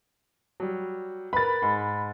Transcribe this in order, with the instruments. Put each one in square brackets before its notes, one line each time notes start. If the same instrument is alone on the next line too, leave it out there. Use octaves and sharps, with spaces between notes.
[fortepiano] F#3 G3
[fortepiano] A#4 B4 [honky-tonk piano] B5 A6
[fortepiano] G#2